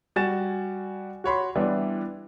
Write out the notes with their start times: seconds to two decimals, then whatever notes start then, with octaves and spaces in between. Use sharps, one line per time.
0.16 G3 F#4 G#5 A6 E7
1.24 F#4 C#5 B5 C6
1.56 E3 G3 B3 D4 E4